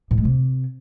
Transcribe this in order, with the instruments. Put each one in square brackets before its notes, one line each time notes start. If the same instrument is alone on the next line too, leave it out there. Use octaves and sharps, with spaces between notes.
[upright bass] A2
G#3
C3